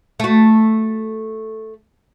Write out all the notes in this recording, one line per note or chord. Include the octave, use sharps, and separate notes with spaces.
A3 F#4